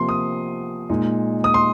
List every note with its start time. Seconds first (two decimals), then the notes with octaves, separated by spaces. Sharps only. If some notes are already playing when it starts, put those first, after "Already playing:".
Already playing: C3 F3 A#3 C6
0.09 D#6
0.90 A#2 G#3 D#4
1.44 D#6
1.54 C6